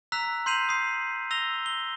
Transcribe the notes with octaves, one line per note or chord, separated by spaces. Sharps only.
A#5 E6 F#6 B6 F7
C6 G6 C7 D#7 F7 F#7
D#6 C7
E6 A#6 F7 G7
G7